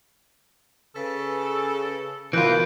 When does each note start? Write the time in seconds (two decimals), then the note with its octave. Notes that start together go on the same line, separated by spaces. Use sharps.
0.96 C#3 A4 B4
2.33 B2 E3 F4 A#4 B5 F#6 G6 D7